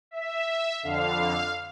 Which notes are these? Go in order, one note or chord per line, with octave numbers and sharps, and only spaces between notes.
E5
F2 D3 F5